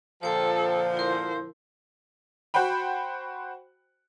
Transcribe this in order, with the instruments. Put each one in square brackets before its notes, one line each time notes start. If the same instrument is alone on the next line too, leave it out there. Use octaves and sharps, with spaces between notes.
[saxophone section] A#2 D3 F3 [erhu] A4 [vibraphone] C5 G5
[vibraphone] E4 A#4 [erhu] C5
[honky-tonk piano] F#4 C5 F#5 G5 B5